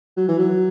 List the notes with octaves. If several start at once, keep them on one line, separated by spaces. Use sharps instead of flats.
F#3
E3
F#3